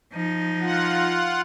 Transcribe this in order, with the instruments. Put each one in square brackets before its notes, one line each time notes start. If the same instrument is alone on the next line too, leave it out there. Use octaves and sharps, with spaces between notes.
[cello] F3 D#4
[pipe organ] F4 F#5